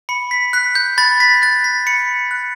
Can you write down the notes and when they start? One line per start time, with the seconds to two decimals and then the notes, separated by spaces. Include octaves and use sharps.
0.09 B5 C#7
0.31 B6
0.53 F#6 B6
0.75 G6
0.98 B5 A6
1.20 B6
1.42 F#6 A6
1.64 B6
1.86 B5 C#7
2.31 F#6